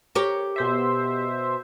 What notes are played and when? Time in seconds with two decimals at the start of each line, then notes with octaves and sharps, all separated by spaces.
0.15 G4 A#4 C#5
0.56 B2 C5 E5